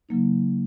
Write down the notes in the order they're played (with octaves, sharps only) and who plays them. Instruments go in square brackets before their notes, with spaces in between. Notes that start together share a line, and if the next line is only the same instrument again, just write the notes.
[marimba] C#3 F#3 A#3 D#4